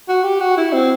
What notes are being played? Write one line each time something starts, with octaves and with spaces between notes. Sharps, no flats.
F#4
G4
F#4
E4
C4